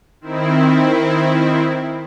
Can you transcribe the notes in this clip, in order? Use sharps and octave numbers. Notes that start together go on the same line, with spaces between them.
D#3 C4 E4